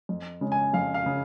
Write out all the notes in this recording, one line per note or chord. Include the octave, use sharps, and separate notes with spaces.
F2
C#3 G#3
G#5
F2 F5
F5
C#3